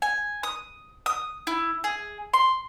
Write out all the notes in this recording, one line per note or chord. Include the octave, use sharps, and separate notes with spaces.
G#5
D#6
D#6
E4
G#4
C6